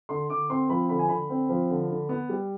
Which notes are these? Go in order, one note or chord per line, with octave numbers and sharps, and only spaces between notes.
D3 C6
D3 D6
C4 C6
F3 B5
D3 B5
G#5
D3 B5
C4
F3
D3
D3
B3
G3